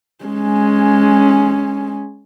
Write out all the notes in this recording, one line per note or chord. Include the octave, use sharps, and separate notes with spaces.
G#3 C#4